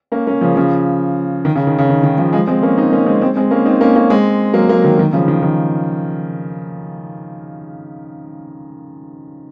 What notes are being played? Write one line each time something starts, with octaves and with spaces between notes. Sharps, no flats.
A#3 C#4
A#3 C#4
C#3 F3
C#3 F3
D#3
C#3
D#3
C#3
D#3
D#3
C#3 F3
F3 G#3
G#3 C4
A#3 C#4
C4 D#4
A#3 C#4
G#3 C4
G#3 C4
G#3 C4
A#3 C#4
C4 D#4
A#3 C#4
A#3 C#4
G#3 C4
F#3 A#3
F#3 A#3
D#3 F#3
D#3 F#3
C#3 F3
D#3
D#3